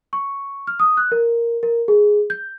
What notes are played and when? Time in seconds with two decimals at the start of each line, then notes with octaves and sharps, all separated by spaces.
0.13 C#6
0.67 F6
0.80 D#6
0.97 F#6
1.12 A#4
1.63 A#4
1.88 G#4
2.30 G6